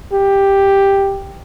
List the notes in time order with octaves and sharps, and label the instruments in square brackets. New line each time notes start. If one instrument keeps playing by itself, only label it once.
[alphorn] G4